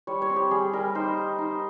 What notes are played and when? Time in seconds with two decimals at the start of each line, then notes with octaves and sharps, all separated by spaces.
0.07 G3 C#5
0.22 C#5
0.29 C4
0.36 G4
0.51 G3 G#4
0.73 G3 A#4
0.95 D#4 C5
1.17 D#4
1.38 D#4